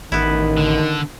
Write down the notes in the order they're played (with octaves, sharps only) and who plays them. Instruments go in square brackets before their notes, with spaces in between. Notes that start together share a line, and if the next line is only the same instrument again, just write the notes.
[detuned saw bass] A1 [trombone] D#3 [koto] B3 E4
[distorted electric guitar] D3